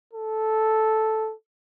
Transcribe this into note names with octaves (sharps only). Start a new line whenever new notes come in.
A4